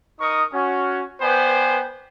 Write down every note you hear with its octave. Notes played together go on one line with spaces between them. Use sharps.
D#4 A#4 C#6 D#6
C#4 F#4
B3 B4 C5 D5 G5 G#5